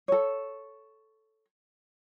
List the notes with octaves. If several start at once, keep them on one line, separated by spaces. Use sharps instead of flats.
A4 C#5